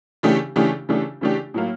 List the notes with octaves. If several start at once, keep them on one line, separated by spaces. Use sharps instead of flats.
C#3 E3 A3 D4 G4
C#3 E3 A3 D4 G4
C#3 E3 A3 D4 G4
C#3 E3 A3 D4 G4
A2 F#3 A#3